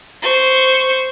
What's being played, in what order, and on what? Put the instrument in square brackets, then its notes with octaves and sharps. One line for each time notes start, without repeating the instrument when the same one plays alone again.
[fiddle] C5 C#6